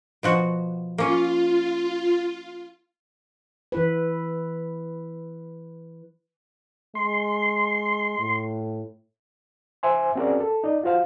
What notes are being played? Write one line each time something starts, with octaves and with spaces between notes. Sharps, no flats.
B2 F3 F#4
A#3 C#4 F4
E3 E4 B4
G#3 C6
A2
C5 E5 G#5 C6
C4 C#4 F#4 G#4 A#4 D5
A4
D#4 D5
F4 F#4 C5 F5